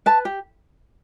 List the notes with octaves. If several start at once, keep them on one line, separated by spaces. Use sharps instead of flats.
B4 A5
G4